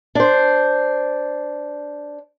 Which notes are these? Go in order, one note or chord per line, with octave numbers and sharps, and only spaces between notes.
D4 C5